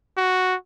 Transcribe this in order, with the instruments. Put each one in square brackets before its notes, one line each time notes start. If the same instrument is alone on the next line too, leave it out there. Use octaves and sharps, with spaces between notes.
[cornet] F#4